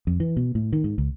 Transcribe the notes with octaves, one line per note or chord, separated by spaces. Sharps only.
F2
E3
B2
A2
D#3
G#2
C#2